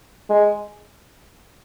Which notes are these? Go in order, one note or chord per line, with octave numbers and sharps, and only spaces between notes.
G#3